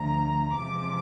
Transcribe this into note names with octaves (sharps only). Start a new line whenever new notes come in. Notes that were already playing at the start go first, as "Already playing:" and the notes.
Already playing: D2 D3 F3 A#5
E2 C3 F3 G#3 D6